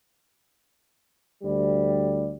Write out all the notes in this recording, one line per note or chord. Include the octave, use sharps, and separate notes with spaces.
D2 G3